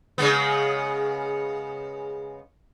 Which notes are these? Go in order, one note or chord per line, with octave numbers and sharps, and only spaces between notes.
C#3 G#3 B3